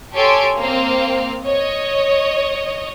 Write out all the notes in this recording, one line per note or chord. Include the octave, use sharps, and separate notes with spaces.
G4 A4 C#5 G#5 C6 D7
A#3 C4 F5
C#5 D#5